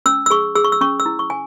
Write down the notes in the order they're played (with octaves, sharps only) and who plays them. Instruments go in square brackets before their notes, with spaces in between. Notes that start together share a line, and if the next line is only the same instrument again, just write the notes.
[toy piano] C#4 E6
E6
G#4 C#6
G#4 E6
C#6
E6
C#4 C#6
E6
E4
C#6
G#5